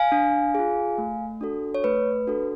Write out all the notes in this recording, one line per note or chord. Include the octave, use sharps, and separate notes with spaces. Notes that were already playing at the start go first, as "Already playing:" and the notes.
Already playing: F5 G#5
D4
F4 G#4
A3
D4 F#4 A4
C#5
A3 B4
D4 F#4 A4